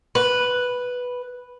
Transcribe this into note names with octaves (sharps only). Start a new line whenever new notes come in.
B4